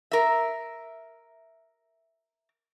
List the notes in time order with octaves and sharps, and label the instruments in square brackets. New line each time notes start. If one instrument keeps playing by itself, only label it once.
[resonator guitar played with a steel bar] A#4 E5